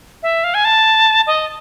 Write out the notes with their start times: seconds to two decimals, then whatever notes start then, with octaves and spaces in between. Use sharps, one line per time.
0.23 E5
0.44 F5
0.54 G#5
0.65 A5
1.27 D#5